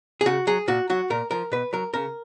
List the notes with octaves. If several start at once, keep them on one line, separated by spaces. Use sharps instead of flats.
G#4
C#3 F#4
F#3 G#4
A#2 F#4
F#3 F#4
A#2 A#4
F3 A#4
B2 B4
F#3 A#4
C#3 A#4